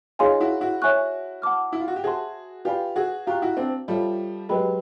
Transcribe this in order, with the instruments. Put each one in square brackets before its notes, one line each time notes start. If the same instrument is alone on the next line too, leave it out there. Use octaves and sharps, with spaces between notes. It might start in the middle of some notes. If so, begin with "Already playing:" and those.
[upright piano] D#4 F4 [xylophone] G#4 C#5 F5 G#5 C6
[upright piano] E4 F#4
E4 F#4
[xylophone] C#5 E5 G#5 C#6 F#6
F#5 A5 D6 F6
[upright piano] E4
F4
F#4
G4
[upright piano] F#4 G#4 [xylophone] C5 E5 A5 C6
[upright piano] F4 G4 [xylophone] B4 D5 F5 G#5 B5
[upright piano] F#4 G#4
[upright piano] F4 G4 [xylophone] F5 A#5 C#6 F#6
[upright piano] E4 F#4
C4 D4
[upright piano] F3 G3 [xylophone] A4 C#5 E5
[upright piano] F#3 G#3 [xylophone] G4 B4 D#5 G5 B5